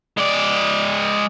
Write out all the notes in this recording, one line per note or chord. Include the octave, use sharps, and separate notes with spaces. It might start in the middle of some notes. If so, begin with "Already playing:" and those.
G#3 D5